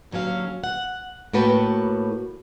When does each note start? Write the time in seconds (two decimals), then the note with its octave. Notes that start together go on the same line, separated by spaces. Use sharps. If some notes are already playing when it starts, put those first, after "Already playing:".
0.11 D#2 D3 F#3 C#4 F5
0.64 F#5
1.33 A2 A#3 F#4 B4 G5 A5